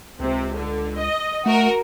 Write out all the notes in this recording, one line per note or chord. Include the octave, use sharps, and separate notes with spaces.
C#2 C3
D3
D#5
A3 F#4 A#4